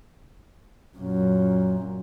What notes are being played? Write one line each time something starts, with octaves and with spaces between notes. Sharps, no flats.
F#2 A#2